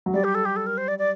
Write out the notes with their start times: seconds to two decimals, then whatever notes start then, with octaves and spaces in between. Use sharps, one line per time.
0.06 F#3
0.14 G3 D5
0.24 G4
0.35 A4
0.45 G4
0.56 A4
0.67 A#4
0.78 C5
0.88 D5
0.99 D5